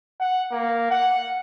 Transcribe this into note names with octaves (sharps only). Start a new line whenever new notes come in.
F#5
A#3
F#5